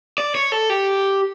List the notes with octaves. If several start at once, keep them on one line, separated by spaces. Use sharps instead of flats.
D5
C#5
A4
G4